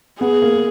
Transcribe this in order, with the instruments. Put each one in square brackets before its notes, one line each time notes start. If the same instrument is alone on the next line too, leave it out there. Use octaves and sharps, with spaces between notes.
[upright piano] B3 [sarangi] G#4
[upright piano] A#3